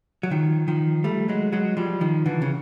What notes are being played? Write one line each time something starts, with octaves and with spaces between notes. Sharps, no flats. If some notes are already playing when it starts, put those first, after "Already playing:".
F#3
D#3 F3
D#3 F3
G3 A3
F#3 G#3
F#3 G#3
F3 G3
D#3 F3
D3 E3
C#3